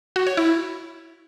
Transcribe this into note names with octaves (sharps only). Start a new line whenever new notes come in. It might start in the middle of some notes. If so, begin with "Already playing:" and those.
F#4
C#5
E4